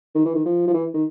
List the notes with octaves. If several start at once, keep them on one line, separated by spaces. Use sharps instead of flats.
D#3
E3
D#3
F3
F3
E3
D#3